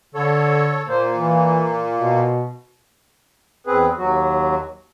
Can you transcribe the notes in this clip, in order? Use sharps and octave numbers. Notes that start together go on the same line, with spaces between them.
D3 A4 C#5
A#2 A#3 C5
E3
B2
E2 C4 G#4 B4
D#2 F#3 F#4